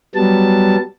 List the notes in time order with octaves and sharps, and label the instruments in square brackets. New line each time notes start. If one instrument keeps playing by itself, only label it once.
[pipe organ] F#3 G3 B3 A5